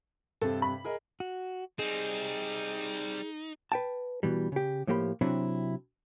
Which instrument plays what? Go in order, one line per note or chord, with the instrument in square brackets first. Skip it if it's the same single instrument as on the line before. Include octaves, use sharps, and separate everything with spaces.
[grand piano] G2 C3 [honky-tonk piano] A4
[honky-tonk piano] B5
[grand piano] G#4 A#4 D#5
[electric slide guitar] F#4
[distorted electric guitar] G3 C4 [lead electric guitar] D#4 [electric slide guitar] G#4
[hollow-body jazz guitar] B4 G5 A5
B2 E3 G3
C#3 G4
A2 F3 A#3 G4 D#5 B5
C3 F#3 C4 D4 E4